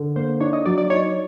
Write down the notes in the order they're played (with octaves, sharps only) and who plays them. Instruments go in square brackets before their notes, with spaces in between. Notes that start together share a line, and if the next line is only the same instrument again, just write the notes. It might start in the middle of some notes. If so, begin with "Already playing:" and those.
Already playing: [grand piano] D3
[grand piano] A#3 [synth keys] C5
[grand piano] D4 [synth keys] C#5
[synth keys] D#5
[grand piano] F#3 [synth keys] D5
[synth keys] D5
[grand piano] D#4 [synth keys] C#5